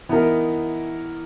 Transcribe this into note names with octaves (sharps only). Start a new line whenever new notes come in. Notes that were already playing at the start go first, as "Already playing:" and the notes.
E3 B3 D#4 A#4